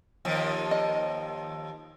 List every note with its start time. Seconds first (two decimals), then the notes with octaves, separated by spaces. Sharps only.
0.25 D#2 D#3 F3
0.71 D#5